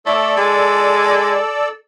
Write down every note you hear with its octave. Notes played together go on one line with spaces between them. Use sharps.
A3 A4 D5 E6
G#3